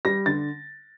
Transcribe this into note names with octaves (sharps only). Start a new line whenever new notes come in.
G3 A#6
D3 A6